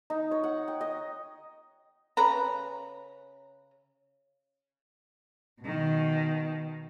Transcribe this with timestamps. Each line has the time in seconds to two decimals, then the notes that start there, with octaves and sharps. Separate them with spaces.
0.10 D#4
0.31 C#5
0.44 F#5
0.68 G5
0.81 D#5
2.17 C#3 B4 A#5
5.61 B2 D#3